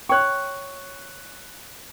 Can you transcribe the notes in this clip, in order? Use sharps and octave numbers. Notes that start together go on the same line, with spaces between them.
C#5 G5 C#6 F#6